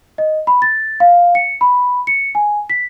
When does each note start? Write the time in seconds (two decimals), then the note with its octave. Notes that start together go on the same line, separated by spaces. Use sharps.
0.18 D#5
0.47 B5
0.62 A6
1.00 F5
1.35 C#7
1.61 B5
2.07 C#7
2.35 G#5
2.70 B6